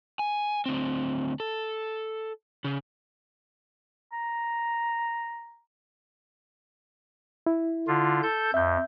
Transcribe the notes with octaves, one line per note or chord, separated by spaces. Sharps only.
G#5
D2 C4
A4
C#3
A#5
E4
D3 F4
A4 G6
F2 E5 G6